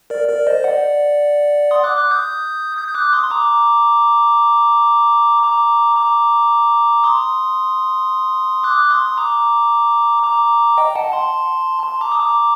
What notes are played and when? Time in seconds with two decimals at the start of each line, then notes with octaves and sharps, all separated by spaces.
0.10 A#4 D5
0.29 A#4 D5
0.47 C5 D#5
0.64 D5 F#5
1.71 C6 D#6
1.84 D6 F#6
1.97 D6 F#6
2.11 D#6 G6
2.77 D#6 G6
2.88 G6
2.95 D6 F#6
3.13 C6 D#6
3.23 C6
3.30 A#5 D6
5.44 A#5 D6
5.97 A#5 D6
7.04 C6 D#6
8.63 D6 F#6
8.90 C6 D#6
9.06 D#6
9.18 A#5 D6
10.23 A#5 D6
10.78 D#5 G5
10.95 F#5 A5
11.12 A5 C6
11.83 A5 C6
12.01 A#5 D6
12.12 D#6
12.20 A#5 D6